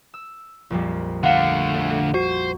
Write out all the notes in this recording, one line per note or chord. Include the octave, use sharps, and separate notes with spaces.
E6
A#1 F2 G3
D3 A3 F5 F#5
F#4 C5